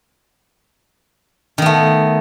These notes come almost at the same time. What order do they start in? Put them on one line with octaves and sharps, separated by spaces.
D#3 B3 A3